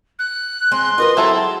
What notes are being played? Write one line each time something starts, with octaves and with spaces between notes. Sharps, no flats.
F#6
G#3 C4 C6
F4 A#4 B4 D#5
F#3 G#3 C4 E4 A4 A#5
A5